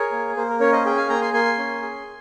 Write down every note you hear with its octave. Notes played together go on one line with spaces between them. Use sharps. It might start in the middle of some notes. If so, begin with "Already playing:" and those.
Already playing: G#4 A#4 C#5
A#3
A#3 C5
A#4
C#4 A#4 C#5
C5 D#5
G#4 G5
F5 G#5
A#3 G5 A#5
G#5 C6
A#3 G#5 C6
C#4
G#4